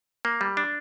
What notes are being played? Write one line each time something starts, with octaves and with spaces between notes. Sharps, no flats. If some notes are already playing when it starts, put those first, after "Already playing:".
A#3
G3
D4